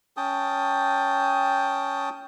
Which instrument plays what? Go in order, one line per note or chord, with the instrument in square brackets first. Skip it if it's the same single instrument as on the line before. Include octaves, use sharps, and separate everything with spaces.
[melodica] C#4 G5 A5 D#6